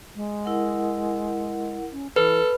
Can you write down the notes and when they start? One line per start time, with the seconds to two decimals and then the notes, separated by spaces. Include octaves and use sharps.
0.15 G#3
0.45 E4 A#4 F#5
1.92 C#4
2.16 E3 A4 B4